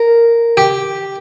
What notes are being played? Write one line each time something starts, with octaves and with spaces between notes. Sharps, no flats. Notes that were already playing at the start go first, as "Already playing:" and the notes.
Already playing: A#4
G4